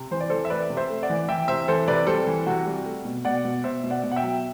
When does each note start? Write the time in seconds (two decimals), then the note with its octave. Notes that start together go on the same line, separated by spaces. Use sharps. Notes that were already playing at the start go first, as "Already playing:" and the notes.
Already playing: C3
0.11 E3 C5
0.20 D5
0.30 E3 A4 C5
0.45 E5
0.50 A3 B4 D5
0.70 C3
0.77 C5 E5
0.90 A3
1.03 D5 F#5
1.10 E3
1.29 E3 E5 G5
1.48 C3 C5 E5
1.68 E3 A4 C5
1.88 C3 B4 D5
2.07 G3 A4 C5
2.27 E3
2.46 C3 F#4
2.67 G3
2.86 A3
3.05 B2
3.25 B2 D5 F#5
3.45 B2
3.64 B2 C5 E5
3.84 B2
3.90 D5 F#5
4.04 B2
4.12 F#5
4.16 E5 G5
4.23 F#3